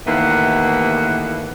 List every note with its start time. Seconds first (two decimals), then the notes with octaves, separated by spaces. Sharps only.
0.07 D#2 A2 E3 A#3 B3 F#5